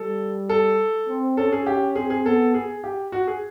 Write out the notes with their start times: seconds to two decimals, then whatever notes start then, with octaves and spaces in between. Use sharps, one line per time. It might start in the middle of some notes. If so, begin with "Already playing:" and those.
Already playing: G3 A4
0.49 A4
1.09 C4
1.37 C#4 A4
1.52 G#4
1.67 G4
1.95 C4 G#4
2.10 G#4
2.25 B3 A4
2.54 G#4
2.84 G4
3.12 F#4
3.27 G#4